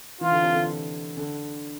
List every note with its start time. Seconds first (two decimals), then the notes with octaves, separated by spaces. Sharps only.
0.21 E3 F4
0.31 D3
0.42 C3
0.52 D3
1.17 D3